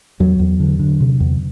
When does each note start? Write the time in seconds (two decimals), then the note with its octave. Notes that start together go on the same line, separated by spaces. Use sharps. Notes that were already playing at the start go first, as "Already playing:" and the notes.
0.20 E2 F#3
0.39 E2
0.60 D3
0.79 D3
1.00 C3
1.20 E2